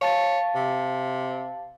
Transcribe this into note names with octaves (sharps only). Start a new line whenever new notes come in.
C#5 F5 A5 A6
C3